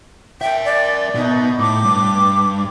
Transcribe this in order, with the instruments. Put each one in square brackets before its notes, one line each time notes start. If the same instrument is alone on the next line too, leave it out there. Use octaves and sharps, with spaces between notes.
[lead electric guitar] A#4 E5 [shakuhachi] G5
[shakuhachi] D5
[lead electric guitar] B2 [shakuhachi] D#4
[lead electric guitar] A2 [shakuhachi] D6
[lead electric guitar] G2